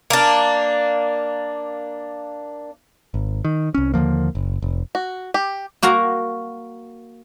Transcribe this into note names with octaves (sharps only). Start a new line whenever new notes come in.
A#3 D4
G#1
D#3
C2 C#4
D#2 D3 F3 A#3
F#1
F1
F#4
G4
A#3 F#4 A#4 A#5